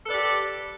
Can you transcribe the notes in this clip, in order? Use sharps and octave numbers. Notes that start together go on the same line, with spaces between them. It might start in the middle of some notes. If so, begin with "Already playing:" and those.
G4 A4 B4 D5